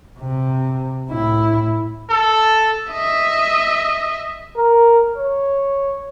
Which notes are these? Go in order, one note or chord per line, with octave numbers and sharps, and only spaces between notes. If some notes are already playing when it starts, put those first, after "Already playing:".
C3
A2 E4
A4
D#5 E5
A#4
C#5